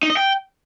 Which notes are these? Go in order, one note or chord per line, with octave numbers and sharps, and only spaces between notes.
D#4
D#5
G5